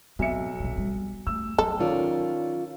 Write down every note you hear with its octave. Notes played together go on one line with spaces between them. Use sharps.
B1 C4 E5 C#7
A#1 D3
G3
A3 E6
F#3 A4
D#3 C#4 F4 D5